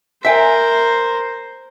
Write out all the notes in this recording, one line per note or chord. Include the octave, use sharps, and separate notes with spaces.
A#4 C5 E5 G5 G#5